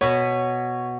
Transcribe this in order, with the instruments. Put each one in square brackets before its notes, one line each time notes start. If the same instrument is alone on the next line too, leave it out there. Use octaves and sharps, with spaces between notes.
[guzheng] B2 B3 [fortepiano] C#5